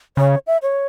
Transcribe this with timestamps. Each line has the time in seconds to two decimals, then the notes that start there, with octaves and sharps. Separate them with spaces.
0.17 C#3 C#5
0.47 E5
0.62 C#5